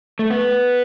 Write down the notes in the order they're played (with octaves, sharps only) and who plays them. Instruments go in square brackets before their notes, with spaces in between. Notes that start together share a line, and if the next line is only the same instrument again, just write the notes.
[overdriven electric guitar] A3
B3